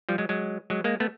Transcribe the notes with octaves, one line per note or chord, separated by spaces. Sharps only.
F3 G3
F#3 G#3
F#3 G#3
F#3 G#3
G#3 A#3
A3 B3